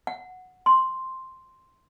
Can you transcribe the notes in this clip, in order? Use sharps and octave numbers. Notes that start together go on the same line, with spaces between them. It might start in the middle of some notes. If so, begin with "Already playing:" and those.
F#5
C6